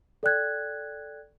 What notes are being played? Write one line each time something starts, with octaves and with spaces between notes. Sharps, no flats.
A4 D5 G5 F#6 G#6